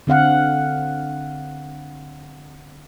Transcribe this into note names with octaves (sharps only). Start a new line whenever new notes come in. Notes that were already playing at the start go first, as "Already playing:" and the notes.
D3 C4 F5 F#5